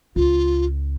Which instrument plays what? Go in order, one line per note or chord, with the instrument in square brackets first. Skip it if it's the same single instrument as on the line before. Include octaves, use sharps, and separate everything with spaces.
[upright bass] C#2 [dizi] F4